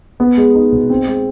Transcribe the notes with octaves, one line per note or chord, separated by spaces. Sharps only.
B3
G#3
D#4
B2
C4
G#3